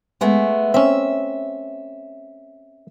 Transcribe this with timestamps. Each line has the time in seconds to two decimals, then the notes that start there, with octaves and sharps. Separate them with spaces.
0.21 G#3 A3 B3
0.74 C4 C#4 E5